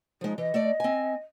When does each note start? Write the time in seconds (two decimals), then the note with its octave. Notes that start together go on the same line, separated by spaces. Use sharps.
0.21 F3 G#3 D#4
0.38 E3 D#5
0.54 A3 D5
0.80 C4 G#5